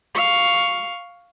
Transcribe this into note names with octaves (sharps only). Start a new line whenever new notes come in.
F5 C#6